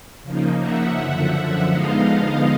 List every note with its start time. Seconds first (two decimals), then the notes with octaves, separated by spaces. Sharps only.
0.23 C#3 F3 A#3 D#4
0.60 E5 F#5
0.97 F#2 D3 F3
1.70 D3 F3 G#3 B3 D#4 D#5 F5